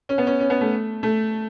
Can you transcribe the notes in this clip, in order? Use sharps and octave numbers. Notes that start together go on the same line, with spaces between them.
C#4
B3
C#4
C#4
B3
A3
A3